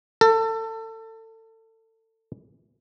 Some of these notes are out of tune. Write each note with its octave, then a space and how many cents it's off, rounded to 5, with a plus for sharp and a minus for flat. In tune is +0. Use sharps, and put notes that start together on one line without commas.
A4 +30